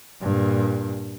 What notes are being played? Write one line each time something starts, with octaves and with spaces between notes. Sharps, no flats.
G2 A#2